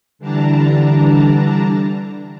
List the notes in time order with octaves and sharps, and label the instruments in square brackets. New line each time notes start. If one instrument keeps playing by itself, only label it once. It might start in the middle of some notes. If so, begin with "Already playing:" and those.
[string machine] D3 E3 G3 D4 A5 A#5